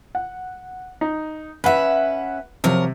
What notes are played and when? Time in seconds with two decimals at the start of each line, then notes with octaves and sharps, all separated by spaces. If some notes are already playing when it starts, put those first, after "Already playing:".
0.15 F#5
1.01 D#4
1.64 C#4 B4 E5 F#5
2.64 C3 F3 F#3 A#4